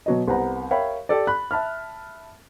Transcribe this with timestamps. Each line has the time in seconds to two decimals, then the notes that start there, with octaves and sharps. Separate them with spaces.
0.06 B2 F#3 D#5
0.28 C2 B3 C5 F#5 A#5
0.71 A#4 C#5 E5 F5 G5 B5
1.09 G4 A4 D5
1.27 B5 F#6
1.51 E5 A5 B5 F6